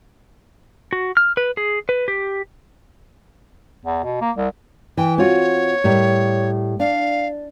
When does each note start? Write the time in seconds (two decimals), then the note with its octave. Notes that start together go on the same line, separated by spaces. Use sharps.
0.93 F#4
1.17 F6
1.37 B4
1.57 G#4
1.89 B4
2.08 G4
3.86 E2
4.03 B2
4.21 A#3
4.37 C2
4.97 E3 G5
5.18 C4 F4 F#4 C#5
5.84 A2 G3 A#4
6.80 D4 F5